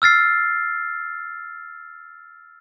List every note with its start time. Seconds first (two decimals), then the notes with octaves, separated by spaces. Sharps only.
0.02 E6 F6 A6 C7